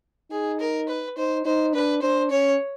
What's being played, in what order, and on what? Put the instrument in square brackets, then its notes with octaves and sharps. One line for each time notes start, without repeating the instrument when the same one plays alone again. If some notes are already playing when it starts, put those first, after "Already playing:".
[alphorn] D#4 [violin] G#4
[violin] A#4
B4
[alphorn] D#4 [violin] C5
[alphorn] D#4 [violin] C5
[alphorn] D4 [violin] B4
[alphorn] D4 [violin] C5
[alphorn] C#4 [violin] C#5